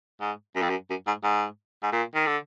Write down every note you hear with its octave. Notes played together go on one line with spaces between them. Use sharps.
G#2
F#2
F2
F#2
F#2
G#2
G#2
G#2
A#2
D#3
D3